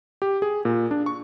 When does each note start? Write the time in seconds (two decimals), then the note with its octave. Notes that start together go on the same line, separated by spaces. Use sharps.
0.22 G4
0.42 G#4
0.65 A#2
0.91 D4
1.06 C#6